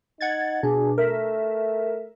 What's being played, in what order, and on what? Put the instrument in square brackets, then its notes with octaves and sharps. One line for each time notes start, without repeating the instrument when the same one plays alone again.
[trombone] D#4 [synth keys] F#5 G#6 A6
[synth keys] B2 D4 [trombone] G#4
[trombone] A3 [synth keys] A#4 E5